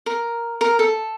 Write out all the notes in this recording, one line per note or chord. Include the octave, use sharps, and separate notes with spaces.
A#4
A#4
A4